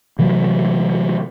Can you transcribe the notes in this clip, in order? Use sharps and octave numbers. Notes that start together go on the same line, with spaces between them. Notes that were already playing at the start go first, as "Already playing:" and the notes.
C3 E3 F#3